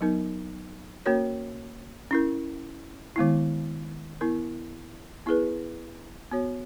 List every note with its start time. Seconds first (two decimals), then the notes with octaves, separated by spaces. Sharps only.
0.01 F#3 B3 D#4 A#4
1.06 A#3 C#4 F#4 A#4 C#5
2.11 C#4 E4 A#4
3.16 D#3 G#3 B3 E4
4.21 B3 E4 A#4
5.26 B3 E4 G#4 B4
6.31 B3 F#4 C#5